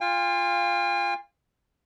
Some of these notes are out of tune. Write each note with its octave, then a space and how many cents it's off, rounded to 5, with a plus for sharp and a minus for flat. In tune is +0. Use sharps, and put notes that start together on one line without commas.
F4 +0 F5 +0 G#5 -45